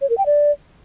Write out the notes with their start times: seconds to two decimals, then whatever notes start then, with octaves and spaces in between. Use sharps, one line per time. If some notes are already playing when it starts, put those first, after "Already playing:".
0.01 C#5
0.09 A#4
0.18 G5
0.26 D5